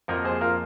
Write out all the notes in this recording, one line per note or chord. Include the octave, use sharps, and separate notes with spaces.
F2 F3 A#3 A#4 D#5
G#4 C5
F4 A#4